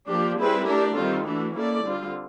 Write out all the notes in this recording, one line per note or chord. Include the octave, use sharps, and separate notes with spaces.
F3 A#3 D4 G4
G3 C4 E4 G#4 B4
A3 D4 G4 A#4
D#3 G3 C4 F4 A4
E3 A3 D4 F#4
A#3 C#4 E4 A4 D5
D3 G3 C4 F4